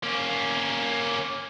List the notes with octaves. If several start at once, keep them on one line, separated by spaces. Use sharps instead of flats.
A#3 C#4